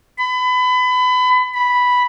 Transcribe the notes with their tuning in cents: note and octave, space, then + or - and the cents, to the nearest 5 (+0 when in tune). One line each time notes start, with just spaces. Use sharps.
B5 +30
B5 +0